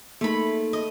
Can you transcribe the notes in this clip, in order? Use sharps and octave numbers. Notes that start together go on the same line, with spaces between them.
A3 A#3 D#4 B5
D#5